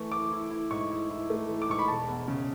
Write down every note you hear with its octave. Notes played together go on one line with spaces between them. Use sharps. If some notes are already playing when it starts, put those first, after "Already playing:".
Already playing: E3 A3 E4 C#6
E3 D6
E4
E4
G#2 C#6
E4
E4
A3
E3
D6
G#2 C#6
B5
E1 A5
E2
C#3